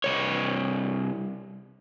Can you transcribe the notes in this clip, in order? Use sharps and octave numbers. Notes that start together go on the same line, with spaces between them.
C2 C#5